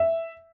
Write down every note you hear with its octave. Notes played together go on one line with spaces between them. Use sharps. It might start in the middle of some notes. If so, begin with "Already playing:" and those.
Already playing: E5